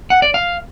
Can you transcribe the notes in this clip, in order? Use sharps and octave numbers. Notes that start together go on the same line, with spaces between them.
F#5
D5
F5